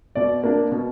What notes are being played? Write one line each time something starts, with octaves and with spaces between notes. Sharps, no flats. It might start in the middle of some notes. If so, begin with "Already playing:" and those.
B2 D5
A#3 D4
B2